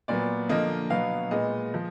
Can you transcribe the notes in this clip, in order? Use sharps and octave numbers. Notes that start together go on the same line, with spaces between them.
A#2 F#3 B3 D5
D3 F3 A#3 D#5
B2 F#3 B3 F5
A#2 G#3 B3 D#5
F3